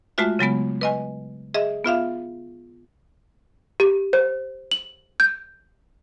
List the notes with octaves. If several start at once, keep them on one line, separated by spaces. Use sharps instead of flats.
G#3 A3 F4 F#4 E5
C#3 F#3 G#3 B3
B4 D#5 G#5
G#4 D#5 E5
B3 F4 E5 F5
G4
C5
F#7
G6